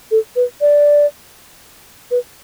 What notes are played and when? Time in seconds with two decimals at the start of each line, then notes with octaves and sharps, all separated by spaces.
0.11 A4
0.36 B4
0.61 D5
2.11 B4